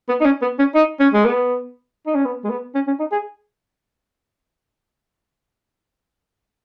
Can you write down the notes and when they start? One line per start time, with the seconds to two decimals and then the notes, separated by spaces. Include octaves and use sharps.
0.09 B3
0.21 D#4
0.25 C#4
0.42 B3
0.59 C#4
0.75 D#4
1.00 C#4
1.13 G#3
1.25 B3
2.06 D#4
2.15 C#4
2.25 B3
2.44 G#3
2.50 B3
2.75 C#4
2.87 C#4
3.00 D#4
3.12 G#4